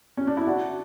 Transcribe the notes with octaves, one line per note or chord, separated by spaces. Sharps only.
C#4
D4
E4
D4 F#4